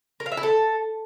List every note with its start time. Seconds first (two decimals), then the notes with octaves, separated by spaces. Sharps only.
0.20 A#4
0.26 F5
0.32 E5
0.37 E4
0.43 A4